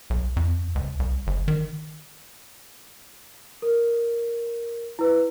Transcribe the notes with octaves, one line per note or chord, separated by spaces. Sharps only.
B1
F2
C#2
C2
G1
D#3
A#4
E4 B4